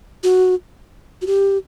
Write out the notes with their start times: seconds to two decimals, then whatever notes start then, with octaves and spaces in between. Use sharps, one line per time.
0.23 F#4
1.22 F#4
1.27 G4